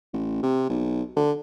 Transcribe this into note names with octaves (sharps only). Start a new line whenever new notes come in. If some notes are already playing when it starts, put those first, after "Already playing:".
A1
C3
B1
D3